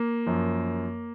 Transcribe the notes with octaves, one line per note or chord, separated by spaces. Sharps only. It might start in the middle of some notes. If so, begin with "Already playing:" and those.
Already playing: A#3
F#2 F3